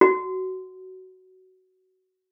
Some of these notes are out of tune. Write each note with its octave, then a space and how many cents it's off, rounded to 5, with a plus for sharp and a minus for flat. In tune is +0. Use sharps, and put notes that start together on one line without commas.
F#4 +15